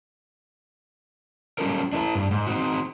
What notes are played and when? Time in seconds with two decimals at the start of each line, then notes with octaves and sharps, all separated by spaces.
1.58 F#3 G3 C#4 F4 A4 A#4
1.93 D4 E4 A4 B4 E5 A5
2.15 G2
2.31 G#2
2.47 C4 D#4 F#4